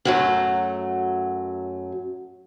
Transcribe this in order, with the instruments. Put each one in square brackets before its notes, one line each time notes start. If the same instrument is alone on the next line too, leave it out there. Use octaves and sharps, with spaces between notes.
[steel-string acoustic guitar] F#2 F#3 A3